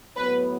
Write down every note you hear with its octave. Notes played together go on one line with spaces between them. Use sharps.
A2 F#3 B3 B4